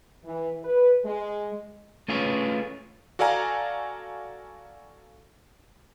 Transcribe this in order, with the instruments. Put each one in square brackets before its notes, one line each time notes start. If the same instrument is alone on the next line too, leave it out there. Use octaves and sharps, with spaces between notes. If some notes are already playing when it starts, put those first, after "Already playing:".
[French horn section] E3
B4
G#3
[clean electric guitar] A3 C#4 F4 G#4 B4 C#5
[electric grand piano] F#4 A4 D5 F5 G#5 A#5